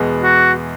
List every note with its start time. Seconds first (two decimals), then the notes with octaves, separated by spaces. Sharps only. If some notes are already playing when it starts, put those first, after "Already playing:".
Already playing: E2 B2 G#3 B3
0.23 F#4